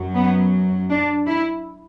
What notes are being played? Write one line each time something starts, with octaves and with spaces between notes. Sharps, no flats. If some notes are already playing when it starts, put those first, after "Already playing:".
Already playing: F#2 F#3
B3
D4
E4